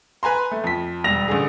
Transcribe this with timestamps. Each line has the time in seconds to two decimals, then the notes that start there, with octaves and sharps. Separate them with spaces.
0.23 B4 G#5 A#5 C6
0.51 A3
0.64 F2 B6
1.04 E1 G3 A#6 F7
1.28 A1 D3 G#4